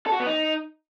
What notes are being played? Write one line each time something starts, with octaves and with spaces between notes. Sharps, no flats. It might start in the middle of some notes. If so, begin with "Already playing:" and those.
A4
F#4
B3
D#4